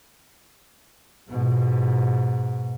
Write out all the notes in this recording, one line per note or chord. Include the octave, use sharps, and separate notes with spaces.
G#2 B2